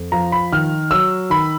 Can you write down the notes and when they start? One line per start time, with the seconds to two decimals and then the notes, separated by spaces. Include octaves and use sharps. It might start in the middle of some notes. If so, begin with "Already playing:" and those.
Already playing: F2
0.12 F3 A#5
0.32 B5
0.53 D#3 F6
0.91 F#3 E6
1.30 D#3 B5